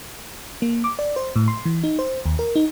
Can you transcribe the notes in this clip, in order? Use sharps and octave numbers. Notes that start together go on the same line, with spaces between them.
A#3
D6
D5
C5
A2
C6
E3
D#4
C5
D#2
A#4
D#4